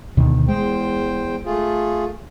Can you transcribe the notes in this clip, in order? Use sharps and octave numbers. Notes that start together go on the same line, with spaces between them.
D2 B2 D#3
E2 G#3 C5 G5
A3 F4 G#4